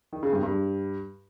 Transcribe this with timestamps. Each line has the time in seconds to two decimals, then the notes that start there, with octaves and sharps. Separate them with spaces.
0.13 D#3
0.23 C#3
0.33 G2
0.43 G2